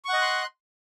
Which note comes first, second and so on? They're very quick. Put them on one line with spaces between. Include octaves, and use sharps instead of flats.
C#6 F#5 D#5 F#6 C6